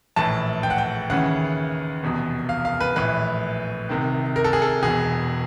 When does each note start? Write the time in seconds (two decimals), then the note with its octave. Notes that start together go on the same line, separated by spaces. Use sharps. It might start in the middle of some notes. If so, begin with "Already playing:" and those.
0.16 A#1 A2 E3 A5
0.63 G5
0.70 F#5
0.78 G5
1.10 D#2 C#3 E3 F#5
2.03 F1 E2 B2
2.49 F5
2.65 F5
2.81 B4
2.96 A#1 A2 E3 B4
3.89 C2 C3 D#3
4.36 A#4
4.44 A4
4.53 G#4
4.62 A4
4.82 E1 E2 B2 G#4